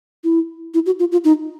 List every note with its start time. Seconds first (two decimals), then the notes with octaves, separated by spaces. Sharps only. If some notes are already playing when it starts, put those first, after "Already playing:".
0.24 E4
0.74 E4
0.86 F#4
0.99 F4
1.12 F4
1.24 D#4